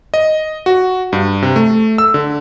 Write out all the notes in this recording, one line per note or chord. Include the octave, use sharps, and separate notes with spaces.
D#5
F#4
G2
C3
A3
E6
D3